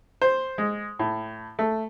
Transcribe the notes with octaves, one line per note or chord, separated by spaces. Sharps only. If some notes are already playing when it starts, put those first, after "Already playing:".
C5
G#3
A2
A3